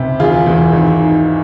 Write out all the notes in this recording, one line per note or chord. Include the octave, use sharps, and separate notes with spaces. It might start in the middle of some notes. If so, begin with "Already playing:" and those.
Already playing: C#2 C3
E1 F4 G#4
E2
G#1
G#2